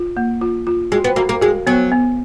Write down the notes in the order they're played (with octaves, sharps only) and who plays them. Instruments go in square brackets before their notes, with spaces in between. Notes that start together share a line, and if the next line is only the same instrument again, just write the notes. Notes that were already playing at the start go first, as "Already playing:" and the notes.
Already playing: [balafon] F4
A#3
F4
F4
[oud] G#3 [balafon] F#4
[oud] B3
[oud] A#3 [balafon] F#4
[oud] A#3
[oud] G#3 [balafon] F#4
[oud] F#3 [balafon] B3
[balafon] B3